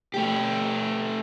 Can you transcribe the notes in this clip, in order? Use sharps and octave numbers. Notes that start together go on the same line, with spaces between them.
A3 G4